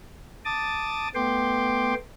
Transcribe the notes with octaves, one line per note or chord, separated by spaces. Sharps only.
A5 D6 D#6 A6
A3 B3 G5 C6 D6